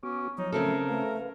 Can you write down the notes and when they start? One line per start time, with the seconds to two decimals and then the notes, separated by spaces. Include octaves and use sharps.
0.03 B3 C#4 F#4 D6
0.38 F3 F#3 D#4 C#5
0.52 C#3 A3 C4 A4 A#4
0.89 A3 B4 F5